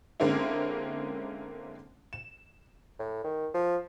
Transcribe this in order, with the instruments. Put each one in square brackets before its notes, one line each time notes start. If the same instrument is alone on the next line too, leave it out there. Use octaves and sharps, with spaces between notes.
[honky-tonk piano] D3 G#3 A#3 C4 C#4 E4
E7
[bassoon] A2
D#3
F3